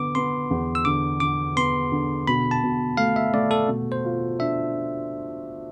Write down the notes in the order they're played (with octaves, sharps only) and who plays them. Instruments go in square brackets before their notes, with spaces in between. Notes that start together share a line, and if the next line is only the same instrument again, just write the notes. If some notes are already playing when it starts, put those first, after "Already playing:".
Already playing: [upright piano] D3 B3 [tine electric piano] D6
[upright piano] B3 [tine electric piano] C6
[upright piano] E2
[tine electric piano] E6
[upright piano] D3 [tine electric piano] D6
[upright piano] D3 [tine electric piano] D6
[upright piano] B3 [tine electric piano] C6
[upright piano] D3
[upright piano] B2 [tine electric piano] B5
[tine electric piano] A5
[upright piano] B2
[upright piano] A3 [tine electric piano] F5
[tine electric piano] E5
[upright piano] A3 [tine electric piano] D5
[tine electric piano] A4
[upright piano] B2
[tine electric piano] C5
[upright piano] F4
[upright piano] D4 [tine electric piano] E5